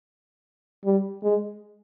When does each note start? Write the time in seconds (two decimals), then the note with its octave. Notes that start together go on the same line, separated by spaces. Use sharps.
0.85 G3
1.24 G#3